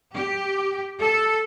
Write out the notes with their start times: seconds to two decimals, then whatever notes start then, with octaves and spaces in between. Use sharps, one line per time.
0.15 G4
1.00 A4